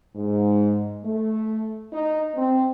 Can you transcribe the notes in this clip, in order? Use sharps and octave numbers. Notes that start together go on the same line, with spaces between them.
G#2
A3
D#4
C4